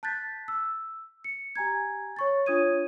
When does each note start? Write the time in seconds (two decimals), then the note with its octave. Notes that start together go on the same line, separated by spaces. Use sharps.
0.03 A5 F#6 G6 A6 B6
0.48 E6
1.24 C#7
1.56 G4 G#5 A#5 G#6
2.16 C#5 C#6 A6
2.46 D4 F4 C#5 D#6 G#6 D#7